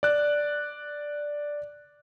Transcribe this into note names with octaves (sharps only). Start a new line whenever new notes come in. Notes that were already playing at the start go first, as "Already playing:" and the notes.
D5 F#6